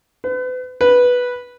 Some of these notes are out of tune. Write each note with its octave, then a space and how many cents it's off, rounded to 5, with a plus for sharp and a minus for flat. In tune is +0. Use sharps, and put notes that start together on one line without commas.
B4 +40
B4 -5